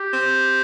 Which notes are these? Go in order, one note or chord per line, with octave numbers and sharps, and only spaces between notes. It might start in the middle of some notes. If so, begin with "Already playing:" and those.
Already playing: G4
C4